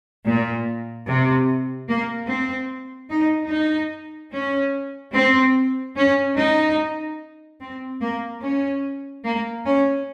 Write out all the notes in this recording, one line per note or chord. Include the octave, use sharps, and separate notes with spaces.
A#2
C3
A#3
C4
D#4
D#4
C#4
C4
C#4
D#4
C4
A#3
C#4
A#3
C#4